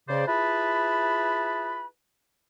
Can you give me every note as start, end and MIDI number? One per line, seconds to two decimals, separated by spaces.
0.09 0.24 49
0.09 0.24 72
0.09 0.24 74
0.27 1.85 64
0.27 1.85 65
0.27 1.85 68
0.27 1.85 71
0.27 1.85 81
0.27 1.85 83